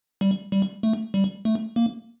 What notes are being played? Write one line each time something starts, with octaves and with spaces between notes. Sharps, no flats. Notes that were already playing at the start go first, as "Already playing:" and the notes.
G3
G3
A3
G3
A3
A#3